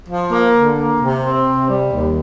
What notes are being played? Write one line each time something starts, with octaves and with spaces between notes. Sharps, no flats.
F3
A#3
D3
A#3
C3
C4
C3
G3
D#2